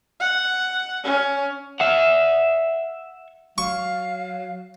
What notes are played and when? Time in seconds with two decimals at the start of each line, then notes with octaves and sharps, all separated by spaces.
0.20 F#5
1.04 C#4
1.80 E5 F#5
3.58 F#3 F5 C#6